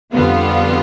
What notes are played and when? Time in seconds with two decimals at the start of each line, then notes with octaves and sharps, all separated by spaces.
0.13 F2 D3 G3 B3 F4